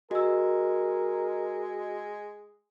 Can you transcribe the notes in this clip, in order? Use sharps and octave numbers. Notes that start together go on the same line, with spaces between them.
G#3 F#4 A#4 D#5 E6